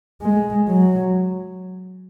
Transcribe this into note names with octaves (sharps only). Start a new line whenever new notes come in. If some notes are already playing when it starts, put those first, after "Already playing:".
G#3
F#3